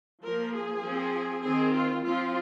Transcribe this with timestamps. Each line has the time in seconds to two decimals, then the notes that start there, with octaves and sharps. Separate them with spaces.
0.25 F3 A#3 A#4
0.55 G#4
0.85 F3 C4
1.44 D#3 C4 G#4
1.75 F4
2.04 F3 C4 F4